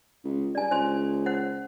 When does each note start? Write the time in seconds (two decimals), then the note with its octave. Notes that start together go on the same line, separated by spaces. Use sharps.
0.24 C#2
0.55 G2 D5 G#5
0.71 C#2 C5 G#5 C6
1.26 C5 F#5